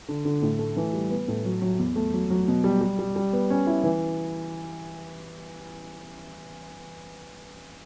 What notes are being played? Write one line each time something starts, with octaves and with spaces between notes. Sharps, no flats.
D3
D3
A2
A3
E3
G3
B3
A2
F#3
F#3
E2
A3
F#3
F#3
B2
G3
G3
G3
G3
B3
C#4
E4
E3